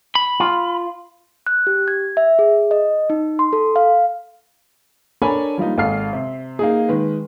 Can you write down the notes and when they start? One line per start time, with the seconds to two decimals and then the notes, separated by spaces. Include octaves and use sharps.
0.15 B5
0.40 F4
1.47 F#6
1.67 G4
1.88 G#6
2.17 E5
2.39 G#4
2.71 D#5
3.10 D#4
3.39 C6
3.53 A4
3.76 F5
5.22 D4 A4 A#4 C#5 G#5 B5
5.58 F3 G3 A#3 D#4
5.78 G#1 A4 F5 F6 C7
6.13 C3
6.59 A#3 D#4 G#4
6.89 D#3 G#3 B4